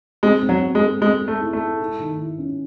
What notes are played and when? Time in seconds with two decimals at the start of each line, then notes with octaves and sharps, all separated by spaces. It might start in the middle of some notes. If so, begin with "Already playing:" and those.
0.23 G#3 C4
0.42 C4
0.49 F#3
0.62 C4
0.75 G#3
0.81 A4
1.01 G#3 C4
1.21 G#3
1.28 A3
1.41 E4
1.53 A3
1.60 E4
1.80 E4
2.00 D#3
2.19 E4
2.38 C#4